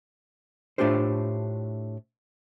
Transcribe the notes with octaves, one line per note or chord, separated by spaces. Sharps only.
A2 A3 D4 F4 G4 C5